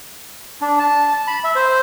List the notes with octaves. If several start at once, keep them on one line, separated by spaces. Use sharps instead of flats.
D4
A5
B5
E5
C5